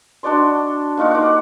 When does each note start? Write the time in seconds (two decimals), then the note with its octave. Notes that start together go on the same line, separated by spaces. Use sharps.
0.23 D4 F#4 D5 C6
0.97 A#3 D#4 F4 F#4
1.11 F#5 D6